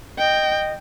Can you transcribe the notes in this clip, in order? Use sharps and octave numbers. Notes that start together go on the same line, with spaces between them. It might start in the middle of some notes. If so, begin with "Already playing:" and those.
D#5 G5